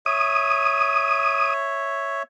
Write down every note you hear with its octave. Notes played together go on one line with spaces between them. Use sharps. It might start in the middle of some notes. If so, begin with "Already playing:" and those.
C#5 E5 D#6